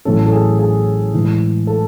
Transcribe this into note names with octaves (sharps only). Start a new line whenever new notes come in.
A1 A2 F#3 C#4 A4
A4
G#4
G#4
A2 E3 G#3
A4